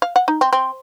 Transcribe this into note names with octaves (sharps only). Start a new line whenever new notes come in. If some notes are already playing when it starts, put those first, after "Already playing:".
F5
F#5
D#4
C4
C4